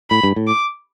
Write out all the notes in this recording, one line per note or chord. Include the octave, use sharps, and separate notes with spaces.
A2 B5
G2
A2
D6